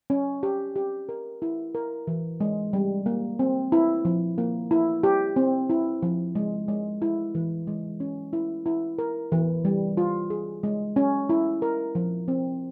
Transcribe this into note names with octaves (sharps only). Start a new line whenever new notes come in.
C#4
G4
G4
A#4
E4
A#4
E3
G#3
G3
A#3
C4
E4
F3
A#3
E4
G4
C4
E4
F3
G#3
G#3
E4
E3
G#3
C#4
E4
E4
A#4
E3
G3
F4
G#4
G#3
C#4
E4
A#4
F3
C4